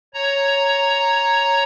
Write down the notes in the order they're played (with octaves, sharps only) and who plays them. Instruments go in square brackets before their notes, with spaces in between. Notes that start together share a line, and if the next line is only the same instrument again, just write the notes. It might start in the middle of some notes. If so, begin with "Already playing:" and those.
[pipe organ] C#5 A#5